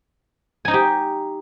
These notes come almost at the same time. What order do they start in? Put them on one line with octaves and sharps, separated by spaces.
G#5 D#4 D#5 G4